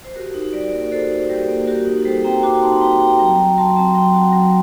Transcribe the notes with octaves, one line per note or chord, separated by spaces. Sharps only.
C5
F#4 G4 A#4
D#4
G3 A#4 D5
A#3 A#4 D5
F#4 A4 C5
D#4
G3 G4 A#4
A#3
F#4 G4 A#4
D#4
G3 A4 C5
C4 G5 A#5
F#4 A#5 D6
D#4 A5 C6
G3 G5 A#5
C4 G5 A#5
F#3 G5 A#5
F#4
F#3 A5 C6
C4 A5 C6
F#3 G5 A#5
F#4 F#5 A5
F#3